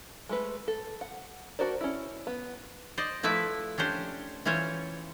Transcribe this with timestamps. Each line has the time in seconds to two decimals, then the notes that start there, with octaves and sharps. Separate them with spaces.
0.29 G#3 A3 B4
0.68 A4
1.01 F#5
1.59 D4 F#4 A#4 C5 D5
1.81 C#4 E4
2.27 B3
2.98 C5 D5 D#5
3.23 F3 A3 E4 B4 E5
3.78 C#4 D4 G4 C5
4.45 E3 C#4 F4 C5 C#5